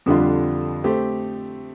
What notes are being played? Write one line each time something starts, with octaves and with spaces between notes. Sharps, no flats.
F2 D3 G3 D4 F4
A3 C4 G4